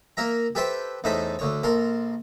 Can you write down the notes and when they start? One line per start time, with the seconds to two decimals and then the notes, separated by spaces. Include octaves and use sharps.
0.17 A#3 A#4 E5 A#5
0.55 G4 A4 B4 C5 E5 G5
1.04 E2 A2 D#4 A4 C5 E5
1.39 D2 D3 C#5
1.63 A#1 A4 A#4 C6